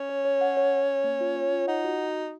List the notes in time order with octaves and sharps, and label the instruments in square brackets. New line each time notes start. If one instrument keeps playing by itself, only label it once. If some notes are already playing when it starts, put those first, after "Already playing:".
Already playing: [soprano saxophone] C#4
[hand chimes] C#5
C#5
F#5
C#5
C#5
C#5
A#3
F4
C#5
F4
[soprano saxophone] D#4 [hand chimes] F#5
[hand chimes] F#4